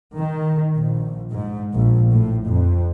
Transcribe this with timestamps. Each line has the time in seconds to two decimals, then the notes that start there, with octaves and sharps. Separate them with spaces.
0.15 D#3
0.76 A#1
1.31 G#2
1.75 A#1
2.12 A2
2.45 F2